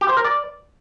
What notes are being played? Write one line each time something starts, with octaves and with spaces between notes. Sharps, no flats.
G4
C5
A#4
D5